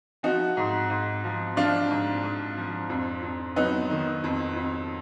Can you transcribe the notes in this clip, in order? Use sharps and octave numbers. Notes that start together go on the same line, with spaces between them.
F3 D#4 F#4
G#2
G#2
F3
F3 D4 F4
G#2
G#2
F3
F2
F2
F#3 B3 D#4
D#3
F2
F2